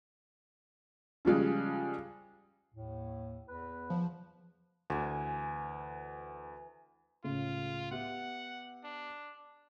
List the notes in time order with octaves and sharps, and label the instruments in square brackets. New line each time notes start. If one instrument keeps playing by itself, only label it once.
[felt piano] C#3 F3 G3 G#3
[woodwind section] D#2 A2
E2 B4
[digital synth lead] F3
[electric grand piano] D2 [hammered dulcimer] E3 G#5
[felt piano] C#2 A2 C#3 [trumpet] F4
[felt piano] B3 G4 E5 [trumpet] F#5
[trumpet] D4